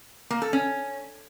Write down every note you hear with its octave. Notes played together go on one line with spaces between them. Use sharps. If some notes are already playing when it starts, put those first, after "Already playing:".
A#3
A4
C#4